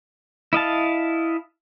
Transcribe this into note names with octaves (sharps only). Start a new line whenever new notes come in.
E4 D#5 F5 A5